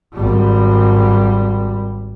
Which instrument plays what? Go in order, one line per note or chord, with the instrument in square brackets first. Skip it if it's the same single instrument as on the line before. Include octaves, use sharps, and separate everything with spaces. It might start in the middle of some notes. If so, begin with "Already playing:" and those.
[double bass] G#1 G3